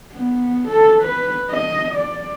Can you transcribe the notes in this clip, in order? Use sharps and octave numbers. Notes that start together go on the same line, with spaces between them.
B3
A4
B4
D#5
D5